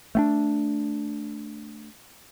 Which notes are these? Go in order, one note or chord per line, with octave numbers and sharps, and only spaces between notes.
A3 B3 D4